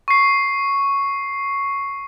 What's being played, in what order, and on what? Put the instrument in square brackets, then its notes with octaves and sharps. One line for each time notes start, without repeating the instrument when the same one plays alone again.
[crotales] C#6 C7